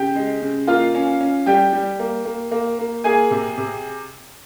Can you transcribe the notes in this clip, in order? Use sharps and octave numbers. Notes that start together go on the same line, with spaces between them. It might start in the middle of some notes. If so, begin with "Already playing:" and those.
Already playing: C#3 G4 G5
G#3
C#3
A#3 F4 F5
C#4
C#4
G3 G4 G5
G3
A#3
A#3
A#3
A#3
A#3 G#4 G#5
C3
C3